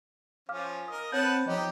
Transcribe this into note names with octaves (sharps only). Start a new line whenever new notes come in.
F3 C#4 F5 D6 F6
A#4 D#5 D#6
C4 B4 C#5 F#5 A5 G6
F3 D#4 G4 C#5 D#5